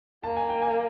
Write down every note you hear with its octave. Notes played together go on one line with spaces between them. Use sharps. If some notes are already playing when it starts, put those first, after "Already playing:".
A#3 A5
G#5
G5
G#5